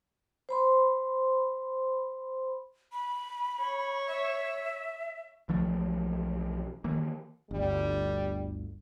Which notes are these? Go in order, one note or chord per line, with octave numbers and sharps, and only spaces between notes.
C5 B5 C6
B5
C#5
E5
B1 E3 F3 A3
D#3 E3 A#3
G1 D2 G3